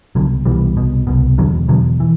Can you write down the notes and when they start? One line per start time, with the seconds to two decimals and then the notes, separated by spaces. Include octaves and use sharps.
0.15 C2 B2 D3 F#3
0.45 C2 B2 E3 G3
0.77 C2 B2
1.07 C2 B2
1.38 E2 B2 D3 F#3
1.68 E2 B2 D3 F#3
2.00 E3